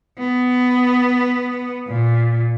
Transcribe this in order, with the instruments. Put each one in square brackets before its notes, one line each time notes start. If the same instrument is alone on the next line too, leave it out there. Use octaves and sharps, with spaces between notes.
[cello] B3
A#2